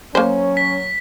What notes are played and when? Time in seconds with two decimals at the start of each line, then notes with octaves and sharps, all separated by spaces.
0.15 F#3 A#3 C#4 C5
0.57 B6